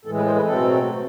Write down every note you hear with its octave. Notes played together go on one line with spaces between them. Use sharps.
A2 E3 G#3 A4
B4
C5
B4
B2 F#3 A3 C4 A4